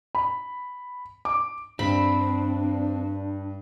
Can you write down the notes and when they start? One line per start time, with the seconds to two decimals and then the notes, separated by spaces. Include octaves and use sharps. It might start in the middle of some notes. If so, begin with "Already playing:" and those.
0.15 B5
1.25 D6
1.79 G2 C4 D4 B5